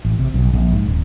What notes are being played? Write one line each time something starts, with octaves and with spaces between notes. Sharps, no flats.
A1
C3
B1
A#1
G#2
D#1